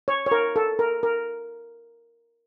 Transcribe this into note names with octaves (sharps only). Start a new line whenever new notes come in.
C#5
C#5
A#4
A4
A#4
A#4